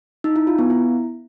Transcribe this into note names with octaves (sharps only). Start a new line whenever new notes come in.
D#4
E4
F4
B3
E4